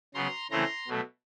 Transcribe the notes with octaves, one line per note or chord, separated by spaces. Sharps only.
C#3 F#3 B3 A#5 C6
C#3 E3 A3 C4 E4 A#5 C6
B2 F#3 A3